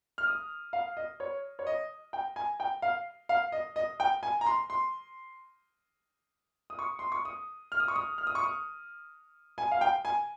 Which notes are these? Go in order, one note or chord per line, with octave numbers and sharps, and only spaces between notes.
F6
D#6
F5
D#5
C#5
C#5
D#5
G5
G#5
G5
F5
F5
D#5
D#5
G5
G#5
A#5
C6
C6
D#6
C#6
C6
C#6
D#6
F6
D#6
C#6
D#6
F6
D#6
C#6
D#6
G#5
F5
G5
G#5